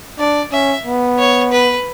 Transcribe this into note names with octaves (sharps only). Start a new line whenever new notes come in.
D4 D5
C#4 E5
B3
C#5
B4